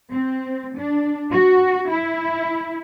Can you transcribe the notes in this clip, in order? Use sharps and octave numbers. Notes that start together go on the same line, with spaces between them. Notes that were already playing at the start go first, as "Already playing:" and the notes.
C4
D4
F#4
E4